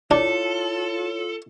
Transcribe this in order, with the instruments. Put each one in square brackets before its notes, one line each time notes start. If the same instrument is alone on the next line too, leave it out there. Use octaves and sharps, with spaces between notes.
[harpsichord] D4 [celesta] E4 C#5 [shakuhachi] F4 [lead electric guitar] A4